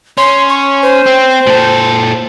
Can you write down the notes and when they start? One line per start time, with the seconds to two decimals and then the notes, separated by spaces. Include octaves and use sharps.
0.18 C#4 C6
0.49 C#6
0.82 C5
1.06 C4
1.47 A#2 A4